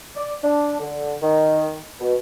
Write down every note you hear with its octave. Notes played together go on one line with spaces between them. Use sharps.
D5
D4
D3
D#3
B2